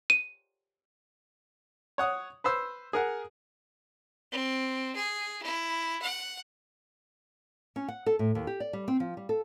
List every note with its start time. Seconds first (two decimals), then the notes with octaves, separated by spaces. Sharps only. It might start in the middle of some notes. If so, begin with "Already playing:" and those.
0.10 D#7
1.98 C#5 F#5 D#6
2.44 B4 C5 E6
2.93 G#4 A#4 F#5
4.32 C4
4.96 G#4
5.43 E4
6.02 F#5
7.76 C#4
7.88 F#5
8.06 A4
8.19 A2
8.35 D#2
8.47 G4
8.60 D5
8.73 G3
8.88 C4
9.00 F3
9.17 G3
9.29 A4